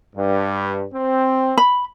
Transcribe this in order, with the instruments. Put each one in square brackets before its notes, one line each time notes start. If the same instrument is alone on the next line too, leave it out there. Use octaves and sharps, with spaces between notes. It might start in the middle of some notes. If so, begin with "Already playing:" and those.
[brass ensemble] G2
C4
[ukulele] B5